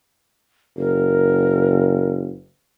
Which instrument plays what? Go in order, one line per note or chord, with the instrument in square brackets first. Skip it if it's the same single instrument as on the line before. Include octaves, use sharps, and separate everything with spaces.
[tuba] F#1 [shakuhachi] A#4